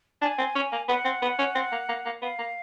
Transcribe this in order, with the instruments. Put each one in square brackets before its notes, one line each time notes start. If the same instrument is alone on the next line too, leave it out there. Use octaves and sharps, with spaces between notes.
[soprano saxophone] D4 [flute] G#5
[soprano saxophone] C4
C#4
A#3
[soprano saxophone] B3 [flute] F#5
[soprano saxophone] C4
B3
C#4
C4
A#3
A#3
A#3
[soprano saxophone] B3 [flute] F5
[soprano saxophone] A#3